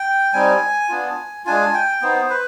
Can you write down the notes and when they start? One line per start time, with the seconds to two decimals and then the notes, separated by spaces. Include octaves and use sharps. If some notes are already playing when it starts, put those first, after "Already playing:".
Already playing: G5
0.33 G3 C4 D#4 G#5
0.89 B3 D4 F4
1.45 G#3 D4 F4 G#5
1.74 G5
2.01 B3 D#4 C5
2.30 B4